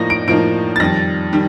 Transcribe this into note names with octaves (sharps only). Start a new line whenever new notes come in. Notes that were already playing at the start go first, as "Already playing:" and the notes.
Already playing: A2 F3 A#3 D#4 A#6
D7
A2 F3 A#3 D#4 D7
A6
F2 D#3 G3 A#6
D#3 G3